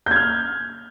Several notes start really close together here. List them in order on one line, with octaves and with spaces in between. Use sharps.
G6 G#6 F6